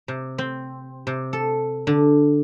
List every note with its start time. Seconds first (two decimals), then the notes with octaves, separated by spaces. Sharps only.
0.08 C3
0.38 C4
1.07 C3
1.33 A4
1.87 D3